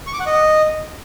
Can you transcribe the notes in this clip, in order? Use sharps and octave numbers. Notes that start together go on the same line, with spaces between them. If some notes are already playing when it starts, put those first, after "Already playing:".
C#6
D6
F#5
D#5